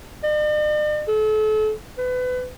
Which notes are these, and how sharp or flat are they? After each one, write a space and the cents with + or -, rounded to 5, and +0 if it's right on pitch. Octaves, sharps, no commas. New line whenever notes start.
D5 +45
A4 -35
B4 +30